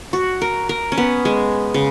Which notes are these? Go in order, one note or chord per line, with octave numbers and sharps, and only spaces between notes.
F#4
A#4
A#4
C#4
B3
G#3
C#3